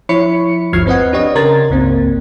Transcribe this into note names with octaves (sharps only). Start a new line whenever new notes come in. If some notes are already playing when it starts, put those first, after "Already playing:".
F3 E4 C#5 B5 C#7
G1 D#2 F3 F6 G#6 C7
C4 B4 D#5 F#5
D4 G4 C#5 D#5
C#3 A#4 A#5 C6 G#6 A6
G1 C#2 A#3 C4